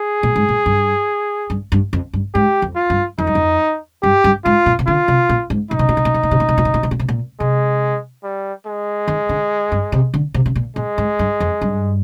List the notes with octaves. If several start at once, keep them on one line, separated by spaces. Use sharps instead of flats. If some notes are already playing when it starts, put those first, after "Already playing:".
Already playing: G#4
A#2
G#2
A#2
G2
G2
G2
F2
G2
G#2 G4
F2
F4
G2
F2 D#4
G2
F2
G2 G4
G2
G#2 F4
A#2
C3
D3 F4
C3
A#2
G#2
A#2 D#4
C3
A#2
C3
A#2
C3
A#2
C3
A#2
C3
A#2
C3
A#2
C3
A#2
C3
A#2
C3 G#3
G3
G#3
D#3
D3
G2
C3
D3
C3
C3
A#2
A#2 G#3
G#2
G2
F2
G2